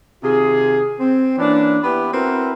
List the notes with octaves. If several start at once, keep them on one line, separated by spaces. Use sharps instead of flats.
C3 D#3 F4 G#4
C4
E3 A#3 C#4 D4
B3 E4 G4 B4
C4 E4 F#4 A#4 B4